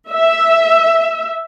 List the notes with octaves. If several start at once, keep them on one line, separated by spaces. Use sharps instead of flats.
E5